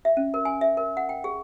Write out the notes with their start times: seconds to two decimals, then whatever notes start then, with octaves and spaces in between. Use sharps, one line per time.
0.05 E5
0.17 C#4
0.34 A#4
0.45 G#5
0.61 E5
0.77 A#4
0.97 F#5
1.09 G5
1.24 G#4